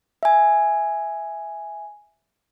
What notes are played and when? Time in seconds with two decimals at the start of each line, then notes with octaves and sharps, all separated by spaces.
0.23 E5 G#5